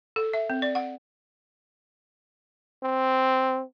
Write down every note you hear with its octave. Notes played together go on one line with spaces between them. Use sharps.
A4
E5
C4
D5
F#5
C4